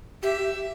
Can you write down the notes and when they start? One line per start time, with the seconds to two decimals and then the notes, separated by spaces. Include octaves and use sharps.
0.23 G4 E5